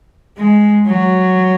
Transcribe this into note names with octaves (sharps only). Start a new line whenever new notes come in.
G#3
F#3